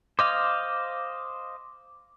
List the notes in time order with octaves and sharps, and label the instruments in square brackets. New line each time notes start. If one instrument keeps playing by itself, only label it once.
[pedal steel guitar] C5 D#5 F5 [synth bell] D6